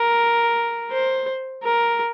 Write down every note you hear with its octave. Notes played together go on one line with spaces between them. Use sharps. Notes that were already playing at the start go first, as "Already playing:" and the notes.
Already playing: A#4
C5
A#4